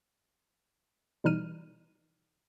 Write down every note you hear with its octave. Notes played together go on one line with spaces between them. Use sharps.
B2 E3 G3 D#4 F6 D#7